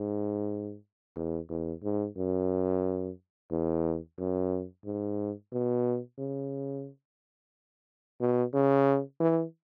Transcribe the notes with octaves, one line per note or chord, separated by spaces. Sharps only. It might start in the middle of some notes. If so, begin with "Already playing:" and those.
Already playing: G#2
E2
E2
G#2
F#2
E2
F#2
G#2
B2
C#3
B2
C#3
E3